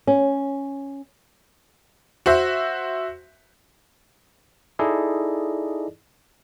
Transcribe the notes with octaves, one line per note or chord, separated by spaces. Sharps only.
C#4
F#4 C5 E5
D#4 E4 G#4 A4 D5 D#5